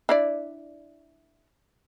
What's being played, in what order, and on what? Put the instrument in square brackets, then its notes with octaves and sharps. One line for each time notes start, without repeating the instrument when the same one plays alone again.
[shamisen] D4 E4 D5